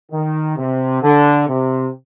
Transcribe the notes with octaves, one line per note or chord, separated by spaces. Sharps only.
D#3
C3
D3
C3